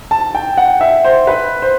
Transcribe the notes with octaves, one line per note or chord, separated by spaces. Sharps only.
A5
G5
F#5
E5
C5
B4
C5